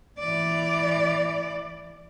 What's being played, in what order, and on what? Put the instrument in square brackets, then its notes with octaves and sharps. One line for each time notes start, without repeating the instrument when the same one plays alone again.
[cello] E3 D5